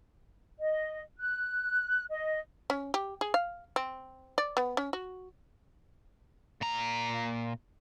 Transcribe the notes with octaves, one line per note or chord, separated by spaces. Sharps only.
D#5
F#6
D#5
C#4
G4
G#4
F5
C4
D5
B3
C#4
F#4
A#2 A#5